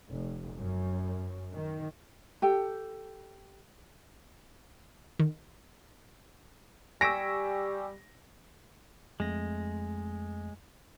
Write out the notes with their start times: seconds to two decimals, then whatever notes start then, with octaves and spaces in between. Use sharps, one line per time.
0.11 F1
0.58 F#2
1.54 D#3
2.42 G4 A4 G5
5.19 D#3
7.01 G3 G4 G#5 C#6 E6 A#6 B6 D7
9.20 F2 G#3 A3 A#6